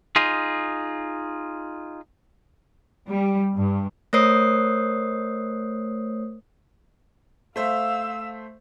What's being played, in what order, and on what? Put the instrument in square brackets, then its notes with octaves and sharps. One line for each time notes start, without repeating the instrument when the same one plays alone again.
[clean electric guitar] D#4 F4 G#4
[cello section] G3
G2
[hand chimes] A3 A#4 C5 C#5 D#6 C7
[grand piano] A3 C5 E5 [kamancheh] F5 E6